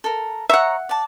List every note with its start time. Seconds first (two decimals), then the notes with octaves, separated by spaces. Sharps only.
0.04 A4 A#4
0.49 C#5 E5 F#5 A#5
0.89 D5 A5